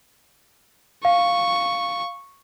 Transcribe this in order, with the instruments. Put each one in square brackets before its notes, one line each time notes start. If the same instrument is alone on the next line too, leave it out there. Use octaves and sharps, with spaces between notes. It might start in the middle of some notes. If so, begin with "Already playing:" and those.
[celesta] F5 [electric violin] C#6